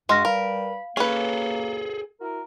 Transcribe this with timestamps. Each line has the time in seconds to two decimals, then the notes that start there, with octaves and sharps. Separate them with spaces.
0.09 G2 G#3 F#4 C6 F6 A#6
0.25 G3 A#4 B4 F5 B5
0.97 A#3 C#4 G#4 A4 B4
2.21 E4 F#4 A#4